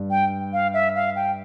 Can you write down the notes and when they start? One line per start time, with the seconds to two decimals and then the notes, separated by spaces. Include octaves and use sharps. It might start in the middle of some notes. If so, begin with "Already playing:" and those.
Already playing: G2
0.10 G5
0.53 F5
0.74 E5
0.95 F5
1.16 G5